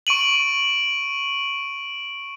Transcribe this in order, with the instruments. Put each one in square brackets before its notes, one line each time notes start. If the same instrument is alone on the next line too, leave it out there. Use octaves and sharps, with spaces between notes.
[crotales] C#6 D7 D#7 F#7